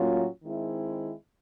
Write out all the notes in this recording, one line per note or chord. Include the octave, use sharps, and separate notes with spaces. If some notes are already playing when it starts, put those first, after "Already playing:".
Already playing: A2 F#3 A#3 C#4 F4
D#3 G#3 C4 E4